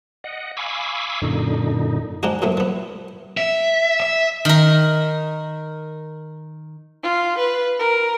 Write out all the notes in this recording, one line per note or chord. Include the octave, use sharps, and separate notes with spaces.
D#5 F#5
F5 G#5 B5 C#6 D6 E6
F#2 A#2 D3 D#4
F3 G#3 D4 D#4 F#4
F#2 A#2 F3 A3
F3 B3
E5
E5
D#3 A#4
F4
B4
A#4